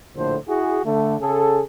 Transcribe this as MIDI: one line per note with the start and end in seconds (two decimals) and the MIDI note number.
0.16 0.37 34
0.16 0.37 45
0.16 0.37 50
0.16 0.37 72
0.48 0.80 64
0.48 0.80 66
0.48 0.80 68
0.84 1.15 50
0.84 1.15 57
1.19 1.62 49
1.19 1.62 68
1.19 1.62 69